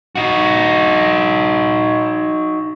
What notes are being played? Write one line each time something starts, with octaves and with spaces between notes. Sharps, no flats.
D#4 F#4